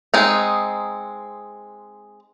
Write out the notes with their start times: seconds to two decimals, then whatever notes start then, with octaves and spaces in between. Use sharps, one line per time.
0.14 G#3 C4 D#4